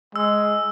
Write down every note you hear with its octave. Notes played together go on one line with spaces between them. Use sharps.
G#3 E6